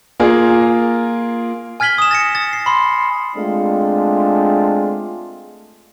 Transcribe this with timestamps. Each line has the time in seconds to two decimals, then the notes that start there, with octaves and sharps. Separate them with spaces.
0.20 A#3 F4 G#4 A#4
1.80 G#5 F6 G#6 B6 F#7 G7
1.98 D#6 E7
2.11 A6 A#6 C#7
2.35 D#6 A6
2.53 C7
2.66 B5 C6
3.36 G#3 A3 C4 D4 F4